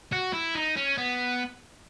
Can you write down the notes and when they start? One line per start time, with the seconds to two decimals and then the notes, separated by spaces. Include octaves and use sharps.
0.12 F#4
0.33 E4
0.55 D#4
0.77 C#4
0.98 B3